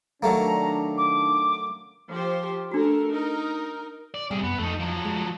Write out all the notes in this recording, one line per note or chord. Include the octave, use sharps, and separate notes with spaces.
D#3 F#3 A3 A#3 D4 A#5
D6
F3 G4 C5
A3 D4 F#4 A4 A#4
D#4 A#4
D5
C3 G3 G#4
F#2 B3
F2 A3 D#4
F3 F#3
G#3